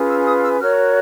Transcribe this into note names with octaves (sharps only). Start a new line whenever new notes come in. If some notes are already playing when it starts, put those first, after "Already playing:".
Already playing: C#4 F4 G#4 B4
E6
D#6
E6
F#4 A#4 C#5 F6